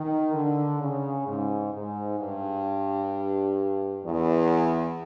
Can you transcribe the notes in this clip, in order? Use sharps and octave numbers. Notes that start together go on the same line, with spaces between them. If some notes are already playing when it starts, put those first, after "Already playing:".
Already playing: D#3
D3
C#3
G#2
G#2
G2
E2